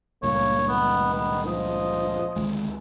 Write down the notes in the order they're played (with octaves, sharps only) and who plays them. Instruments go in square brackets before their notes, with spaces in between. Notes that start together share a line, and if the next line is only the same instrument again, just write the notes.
[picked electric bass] C#2 G2 A#2 [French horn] A#3 [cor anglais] C#5
[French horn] D#3 [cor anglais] B3
[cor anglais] B3
[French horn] F3 [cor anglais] D#5
[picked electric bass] D2 D#3 G#3